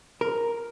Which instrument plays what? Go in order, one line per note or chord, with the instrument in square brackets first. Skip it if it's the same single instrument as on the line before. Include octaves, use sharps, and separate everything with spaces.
[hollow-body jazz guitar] A#4